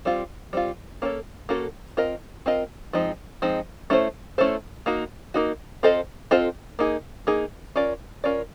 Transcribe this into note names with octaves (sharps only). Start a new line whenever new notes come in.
G3 C4 F4
G3 C4 F4
A#3 C#4 F#4 A4 C#5
A#3 C#4 F#4 A4 C#5
C4 F4 A#4 D#5
C4 F4 A#4 D#5
F3 G#3 C4 D#4
F3 G#3 C4 D#4
A3 C#4 E4 A4 C5
A3 C#4 E4 A4 C5
A#3 D#4 F#4
A#3 D#4 F#4
C4 F4 A4 C5 D#5
C4 F4 A4 C5 D#5
A#3 D#4 G#4
A#3 D#4 G#4
C#4 F4 A#4 D5
C#4 F4 A#4 D5